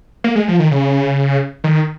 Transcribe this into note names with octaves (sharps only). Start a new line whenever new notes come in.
A#3
G#3
F3
D#3
C#3
D#3